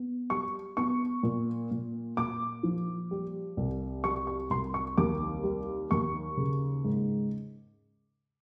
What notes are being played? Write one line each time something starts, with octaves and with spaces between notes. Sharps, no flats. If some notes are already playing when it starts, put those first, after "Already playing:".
Already playing: B3
G3 C#6
B3 C#6
A#2
A#2
A#2 D6
F3
G3
C2
G3 C#6
C#6
C2 C6
C#6
D#2 D6
G3
D#2 C#6
C#3
G#2